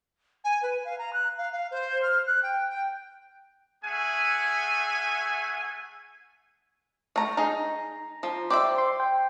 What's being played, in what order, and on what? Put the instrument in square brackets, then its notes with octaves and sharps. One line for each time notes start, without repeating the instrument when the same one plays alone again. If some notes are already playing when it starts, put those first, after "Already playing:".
[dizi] G#5
B4
F5
A#5
F#6
F5
F5
C5
F6
F#6
G5
G5
[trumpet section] A3 C#4 G#4 E5 F#5 G#5
[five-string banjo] A3 A#5
[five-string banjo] D#4 G#4 [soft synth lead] A#5
[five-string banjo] F3
[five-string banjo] G4 D5 E5 [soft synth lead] C5
[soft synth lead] C6
G5